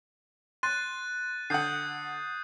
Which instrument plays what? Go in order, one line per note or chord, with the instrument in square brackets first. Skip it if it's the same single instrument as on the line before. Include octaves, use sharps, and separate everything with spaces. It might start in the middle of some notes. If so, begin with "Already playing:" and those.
[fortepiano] C6 [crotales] F#6 A6 D#7
[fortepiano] D3 F#5 [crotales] D#6 G6 C7